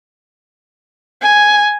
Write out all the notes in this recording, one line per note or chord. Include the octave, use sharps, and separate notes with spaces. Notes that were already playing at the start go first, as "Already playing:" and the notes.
G#5